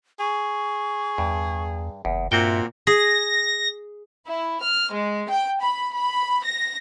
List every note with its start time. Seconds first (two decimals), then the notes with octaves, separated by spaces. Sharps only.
0.20 G#4 C#6
1.18 E2 G2
2.05 F#1 E2
2.32 G2 A#2 C4 F#4 E5 G5
2.87 G#4 A#6
4.26 E4
4.61 F6
4.92 G#3
5.29 G5
5.61 B5
5.94 B5
6.43 A#6